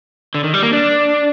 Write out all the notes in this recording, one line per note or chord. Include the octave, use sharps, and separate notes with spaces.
D3
D#3
G3
A#3
D4